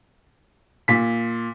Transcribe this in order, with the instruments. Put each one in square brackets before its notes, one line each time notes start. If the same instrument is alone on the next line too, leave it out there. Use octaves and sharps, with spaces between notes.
[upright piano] A#2 B6